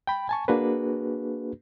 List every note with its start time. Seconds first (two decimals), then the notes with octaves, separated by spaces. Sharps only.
0.07 G5 B5
0.29 G#5 A5 C#6
0.48 A#3 D4 F#4 G#4 B4